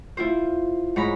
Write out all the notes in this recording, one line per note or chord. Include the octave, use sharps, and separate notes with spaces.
E4 F4 C5
G#2 C#5 A#5 B5